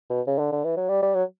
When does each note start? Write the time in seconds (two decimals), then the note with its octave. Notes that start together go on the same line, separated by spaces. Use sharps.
0.10 B2
0.27 C#3
0.39 D3
0.52 D3
0.64 E3
0.77 F#3
0.89 G3
1.03 G3
1.15 F#3